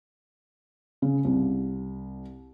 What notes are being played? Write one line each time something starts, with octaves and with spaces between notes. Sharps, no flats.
C#3
C2